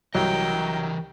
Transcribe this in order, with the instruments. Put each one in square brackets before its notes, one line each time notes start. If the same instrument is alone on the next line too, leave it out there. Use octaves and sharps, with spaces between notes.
[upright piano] C2 [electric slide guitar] E3 A#4 D#5 [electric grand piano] F#3 [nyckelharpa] G5